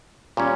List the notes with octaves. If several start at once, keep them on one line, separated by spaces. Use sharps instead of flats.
A#2 G3 C#4